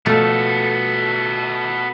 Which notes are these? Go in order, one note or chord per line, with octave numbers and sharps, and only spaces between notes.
B2 F3 A3 B3 A4